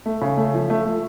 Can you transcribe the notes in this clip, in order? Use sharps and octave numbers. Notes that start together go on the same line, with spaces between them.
A3
C#3
A3
F3
A3
A3